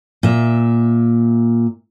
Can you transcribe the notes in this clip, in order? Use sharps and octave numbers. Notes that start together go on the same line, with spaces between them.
A#2 E5